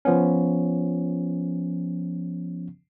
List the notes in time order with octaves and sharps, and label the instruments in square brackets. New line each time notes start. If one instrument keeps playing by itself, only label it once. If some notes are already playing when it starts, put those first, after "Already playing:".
[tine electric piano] F3 B3 C#4